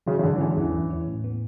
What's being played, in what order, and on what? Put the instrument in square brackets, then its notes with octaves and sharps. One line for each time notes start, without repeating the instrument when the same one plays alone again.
[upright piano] C#3 [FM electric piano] F#3
[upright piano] C#3
[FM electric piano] G#2 [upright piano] D3
[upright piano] E3
[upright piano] D3 [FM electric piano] C#4
[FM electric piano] E2 [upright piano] E3
[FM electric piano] E2
C#4
A2
B3